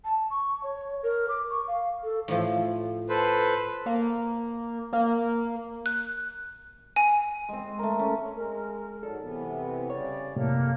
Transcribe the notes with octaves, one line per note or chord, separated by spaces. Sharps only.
A5
C#6
C#5
A#4
D6
C#6
F5
A4
A2 F3
A4 B4 C5
A#3
A#3
F#6
G#5
G#3 C4
A3 A#4
C#4
G#3 A#4
G#2 F#3 A4 D5
C3 E3 B3
C4
C#3 G3 C#5 D5
F#2 A2 C3 A#3 G4 A4